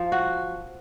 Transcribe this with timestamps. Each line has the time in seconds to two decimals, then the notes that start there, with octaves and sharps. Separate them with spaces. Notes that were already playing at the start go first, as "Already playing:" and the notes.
Already playing: F3
0.12 F#4